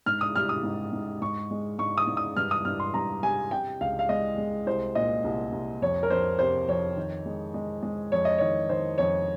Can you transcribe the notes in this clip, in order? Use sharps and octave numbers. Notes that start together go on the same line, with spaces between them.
G#2 F6
D#6
G3 F6
D#6
G#2
G#2
G#2 C#6
G#3
G#2 C#6
D#6
G#2
D#6
G2 F6
D#6
G2 F6
C6
G2 A#5
G3 G#5
C3 G5
C#2 F5
F5
G#3 D#5
G#3
C2 C5
A#2 D#5
C2
C2
F2 C#5
A#4
F2 C5
C3 C5
F2 C#5
D#3
G#3
G#3
G#3
F2 C#5
D#5
D#3 C#5
D#3 C5
F2 C#5